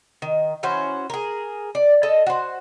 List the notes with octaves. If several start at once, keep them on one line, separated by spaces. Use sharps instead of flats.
D#3
E3 C#4 F#4 C5
G#4 A#4
D5
A4 D#5 A5
F#4 C5